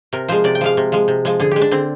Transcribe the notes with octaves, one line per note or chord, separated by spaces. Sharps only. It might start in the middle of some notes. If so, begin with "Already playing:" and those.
C3 A#4
F3 G#3 C5
C3 D5
G5
F3 G#3 F5
C3
F3 G#3
C3
F3 G#3
D3 G#4
G#3 G4
D4
D3 C4